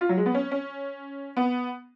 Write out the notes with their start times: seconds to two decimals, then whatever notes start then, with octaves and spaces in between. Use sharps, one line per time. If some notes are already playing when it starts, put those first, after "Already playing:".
0.01 F4
0.09 F#3
0.17 G#3
0.26 B3
0.34 C#4
0.51 C#4
1.37 B3